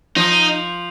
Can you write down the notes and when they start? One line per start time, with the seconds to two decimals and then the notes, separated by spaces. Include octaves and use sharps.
0.16 F3 D#4